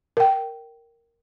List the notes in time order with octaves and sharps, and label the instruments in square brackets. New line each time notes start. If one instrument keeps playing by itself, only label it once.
[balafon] A#4 G5